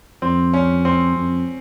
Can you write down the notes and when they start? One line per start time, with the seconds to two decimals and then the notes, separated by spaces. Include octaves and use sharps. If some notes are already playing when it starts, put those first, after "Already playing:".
0.22 F2 C4
0.54 C#4
0.85 C4
1.16 F2